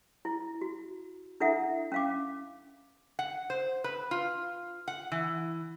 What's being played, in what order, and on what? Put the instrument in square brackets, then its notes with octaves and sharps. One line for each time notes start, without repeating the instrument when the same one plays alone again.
[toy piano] E4
F#4
D4 E4 A4 E5 F#5
C#4 F5 D6
[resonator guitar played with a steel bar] F#5
C5
B4
F4
F#5
E3